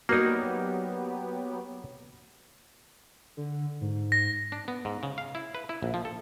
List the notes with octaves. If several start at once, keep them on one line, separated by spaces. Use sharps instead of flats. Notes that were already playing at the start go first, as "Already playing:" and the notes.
F#3 A#3 B3 D#4 F#4 G4 A#4 D5
D3
G#2
A#6
D4
B3
G#2
C#3
F5
E4
B4
E4
A#1
F3
A4